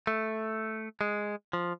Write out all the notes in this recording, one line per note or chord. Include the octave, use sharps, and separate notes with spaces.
A3
G#3
F3